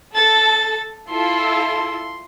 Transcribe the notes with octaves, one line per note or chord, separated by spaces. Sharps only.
A4 A6
E4 F4 A4 C6